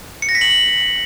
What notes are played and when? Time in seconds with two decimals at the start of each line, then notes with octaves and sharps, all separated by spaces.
0.22 C#7
0.29 A#6
0.35 B6
0.41 F#7